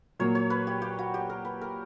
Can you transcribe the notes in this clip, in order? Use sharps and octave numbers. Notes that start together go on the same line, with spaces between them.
A#2 F#3 A#3 C#5
C#5
B4
G4
G4
F#4
G4
A#4
B4
A#4